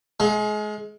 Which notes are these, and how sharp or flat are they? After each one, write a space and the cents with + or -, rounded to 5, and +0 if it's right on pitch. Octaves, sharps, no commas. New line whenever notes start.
G#3 +30 F5 +40